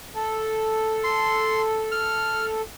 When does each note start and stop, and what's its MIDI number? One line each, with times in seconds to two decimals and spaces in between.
0.15 2.61 69
1.04 1.62 84
1.92 2.46 89